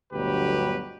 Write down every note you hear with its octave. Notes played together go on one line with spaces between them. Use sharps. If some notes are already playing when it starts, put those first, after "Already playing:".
G1 D2 B2 F#3 G4 B4